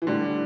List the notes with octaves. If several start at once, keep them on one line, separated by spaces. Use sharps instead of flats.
E3
A2 D3 G3 D4 G4